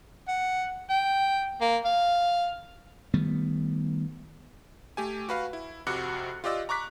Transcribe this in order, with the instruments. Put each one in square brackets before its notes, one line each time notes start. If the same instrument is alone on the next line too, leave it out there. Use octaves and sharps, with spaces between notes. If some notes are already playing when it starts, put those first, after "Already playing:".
[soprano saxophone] F#5
G5
A#3
F5
[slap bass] D#3 G3 A3 B3
[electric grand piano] A3 G4 G#5
F#4 B4 F5
E4
F2 C3 F#4 D6 F#6 C#7
F4 G4 D5 D#5 E6
A#5 C#6 D6 F#6 B6